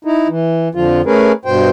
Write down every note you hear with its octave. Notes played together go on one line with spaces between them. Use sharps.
D#4 E4
E3
F2 D3 F3 F4
A3 C#4 G#4 A#4 B4
G2 B2 C5 G5